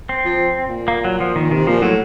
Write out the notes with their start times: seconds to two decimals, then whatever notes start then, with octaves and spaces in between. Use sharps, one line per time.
0.09 C4
0.25 F3
0.67 A#2
0.88 A#3
1.05 F#3
1.20 F3
1.36 D#3
1.51 C3 D#3
1.67 A#2 F3
1.82 A2 F#3